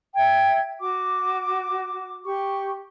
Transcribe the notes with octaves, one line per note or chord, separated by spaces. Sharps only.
E5 G5 G#6
F#4 D6
G4 C#6